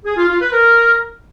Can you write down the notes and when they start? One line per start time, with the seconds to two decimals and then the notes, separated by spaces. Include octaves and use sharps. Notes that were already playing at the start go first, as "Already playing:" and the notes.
0.05 G#4
0.17 F4
0.29 F4
0.41 B4
0.53 A#4